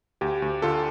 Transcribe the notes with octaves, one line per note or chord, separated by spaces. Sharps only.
D2 G4
D2
D3 F4 A4